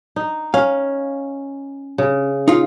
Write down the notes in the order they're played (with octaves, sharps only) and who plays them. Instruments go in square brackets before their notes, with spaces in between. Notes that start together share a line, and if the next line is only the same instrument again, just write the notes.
[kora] D#4
[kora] C#4 [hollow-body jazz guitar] F5
[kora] C#3
[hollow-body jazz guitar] D#4 F4